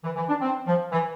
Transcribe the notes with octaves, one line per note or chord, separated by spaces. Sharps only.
E3
E3
D4
C4
F3
E3